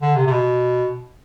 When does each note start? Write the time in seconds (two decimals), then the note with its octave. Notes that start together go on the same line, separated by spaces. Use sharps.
0.01 D3
0.16 C3
0.27 C3
0.31 B2